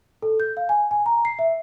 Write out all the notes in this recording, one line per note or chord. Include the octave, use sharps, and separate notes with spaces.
A4
G6
F5
G#5
G#5
A#5
C7
E5